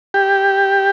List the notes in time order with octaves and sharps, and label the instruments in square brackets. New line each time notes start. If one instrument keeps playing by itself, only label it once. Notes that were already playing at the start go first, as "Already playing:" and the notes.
[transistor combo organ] G4